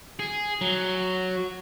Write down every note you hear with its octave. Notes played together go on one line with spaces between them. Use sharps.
G#4
F#3